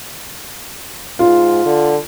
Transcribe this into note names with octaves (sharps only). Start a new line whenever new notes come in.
G#2 F4
D3